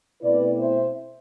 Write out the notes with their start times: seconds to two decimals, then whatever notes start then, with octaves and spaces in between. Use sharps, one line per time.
0.22 B2 A3 C4 E4 B4 D5
0.59 C5 E5